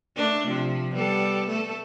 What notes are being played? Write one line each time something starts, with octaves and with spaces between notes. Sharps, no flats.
A3 D4
C3 F3
G3 B3 A4
A3 A4